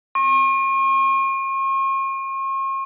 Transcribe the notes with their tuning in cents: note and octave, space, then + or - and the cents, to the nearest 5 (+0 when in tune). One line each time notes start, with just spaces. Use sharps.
C#6 -45